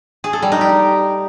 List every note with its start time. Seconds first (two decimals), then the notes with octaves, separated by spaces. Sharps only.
0.24 G#4
0.33 A4
0.42 G3
0.52 D#4
0.61 G4